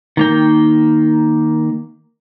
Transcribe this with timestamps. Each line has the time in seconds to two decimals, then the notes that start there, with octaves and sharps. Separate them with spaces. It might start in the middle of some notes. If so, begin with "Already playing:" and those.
0.17 D#3 A#3 G5